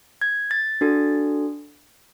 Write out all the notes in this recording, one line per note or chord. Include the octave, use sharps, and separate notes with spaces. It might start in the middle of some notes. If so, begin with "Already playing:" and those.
G#6
A6
D4 F#4 A4